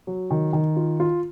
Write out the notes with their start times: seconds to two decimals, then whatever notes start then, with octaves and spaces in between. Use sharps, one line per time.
0.07 F#3
0.31 D#3
0.53 D#3
0.76 F4
1.00 F4